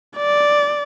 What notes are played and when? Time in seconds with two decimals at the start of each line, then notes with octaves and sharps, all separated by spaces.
0.17 D5